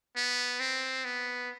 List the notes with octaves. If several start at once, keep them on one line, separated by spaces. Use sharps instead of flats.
B3
C4
B3